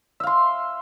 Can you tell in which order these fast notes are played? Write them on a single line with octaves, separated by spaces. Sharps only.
E5 F5 C6